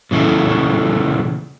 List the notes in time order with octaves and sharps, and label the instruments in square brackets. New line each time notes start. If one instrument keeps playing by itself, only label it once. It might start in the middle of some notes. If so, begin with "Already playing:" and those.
[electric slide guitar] A#2 C#3 E3 A3